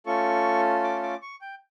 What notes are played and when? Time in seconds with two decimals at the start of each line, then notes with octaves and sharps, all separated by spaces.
0.06 A3 C#4 F4 A4 C#6
0.84 D6
1.03 D6
1.22 C#6
1.41 G5